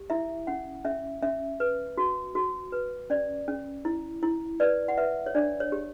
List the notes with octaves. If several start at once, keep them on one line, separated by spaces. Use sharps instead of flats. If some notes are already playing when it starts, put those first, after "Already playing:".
Already playing: G4
E4 E5
C#4 F#5
C#4 E5
C#4 E5
B4
F#4
F#4
B4
C#4 D5
C#4
E4
E4
B4 D5
F#5
B4 E5
C#5
D4 D5
C#5
G4